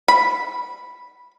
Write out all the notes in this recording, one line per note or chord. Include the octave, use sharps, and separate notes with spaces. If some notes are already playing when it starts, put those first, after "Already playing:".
B5